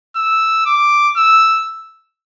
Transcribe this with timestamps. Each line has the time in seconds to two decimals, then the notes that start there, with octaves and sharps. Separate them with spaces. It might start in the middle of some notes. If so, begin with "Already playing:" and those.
0.16 E6
0.66 D6
1.17 E6